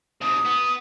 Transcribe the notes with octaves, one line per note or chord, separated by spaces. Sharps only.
D#2 C3 D#6
B3